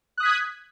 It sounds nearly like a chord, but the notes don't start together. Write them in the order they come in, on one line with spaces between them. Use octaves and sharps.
F#6 D#6 B6 G#6